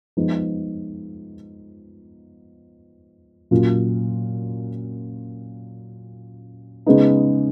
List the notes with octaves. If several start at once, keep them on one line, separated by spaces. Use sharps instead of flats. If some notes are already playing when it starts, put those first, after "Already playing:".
F3 G#3 B3 D#4
A#2 F#3 C#4 F4
C#3 G#3 B3 D#4